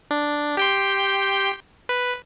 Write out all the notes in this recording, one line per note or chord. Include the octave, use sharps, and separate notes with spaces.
D4
G4 G5 C6
B4